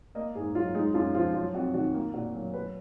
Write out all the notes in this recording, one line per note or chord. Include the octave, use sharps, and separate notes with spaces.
A#3 D#5
G#2 G#4
F#3 F4
G#3 D#4
F#2 F4
F3 F4
F#3 F4
F2 F#4
D#3 F#4
A#3
A#2 F#4
F#3
F#3 B4